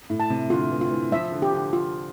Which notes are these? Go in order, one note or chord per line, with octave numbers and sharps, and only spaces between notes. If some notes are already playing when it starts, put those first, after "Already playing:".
A2
A5
C3
D3 F4
E3
F4
E3
F3 E5
D3
G4
D3
F4